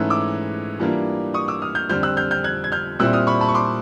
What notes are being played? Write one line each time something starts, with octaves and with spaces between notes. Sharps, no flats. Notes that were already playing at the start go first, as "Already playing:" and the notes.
Already playing: G#2 E3 A3 C#4 E6 F#6
D6 E6
E3 G3 A#3 D4 F4
C#6 D#6
D6 E6
D#6 F6
F6 G6
F2 D3 G3 C4 F6 G6
E6 F#6
F6 G6
F6 G6
F#6 G#6
G#6
F6 G6
A#2 G3 C4 E4 E6 F#6
D#6 F6
B5 C#6
A5 B5
C#6
C6 D6